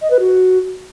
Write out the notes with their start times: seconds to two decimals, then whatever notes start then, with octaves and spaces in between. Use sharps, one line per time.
0.01 D#5
0.10 B4
0.19 F#4